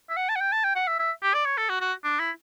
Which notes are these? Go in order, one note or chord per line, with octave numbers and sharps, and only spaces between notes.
E5
F#5
A5
F#5
G5
A5
G5
F#5
E5
E5
G4
D5
C#5
A4
F#4
F#4
D4
E4